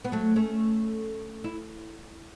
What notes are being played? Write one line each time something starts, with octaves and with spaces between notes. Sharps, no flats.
B3
F#3 A3
A3 C#4
E4